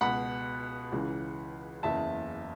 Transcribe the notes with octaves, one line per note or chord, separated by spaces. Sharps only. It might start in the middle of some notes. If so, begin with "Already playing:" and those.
C#2 B2 F#5 B5
C#2 C#3 E3
F#1 E2 C#3 E5 A5